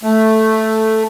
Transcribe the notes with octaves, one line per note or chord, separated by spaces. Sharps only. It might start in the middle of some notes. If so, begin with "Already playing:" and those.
A3